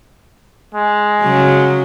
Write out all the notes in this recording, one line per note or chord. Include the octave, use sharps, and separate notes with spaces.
G#3
C#3 F#3